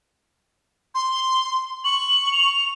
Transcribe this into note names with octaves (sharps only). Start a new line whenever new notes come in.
C6
C#6 F#7
F7